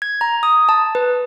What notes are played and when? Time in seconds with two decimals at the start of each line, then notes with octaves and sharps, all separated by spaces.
0.02 G#6
0.21 A#5
0.43 D#6
0.69 A5
0.95 B4